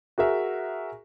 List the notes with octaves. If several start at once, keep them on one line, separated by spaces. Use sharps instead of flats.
F#4 G#4 A#4 E5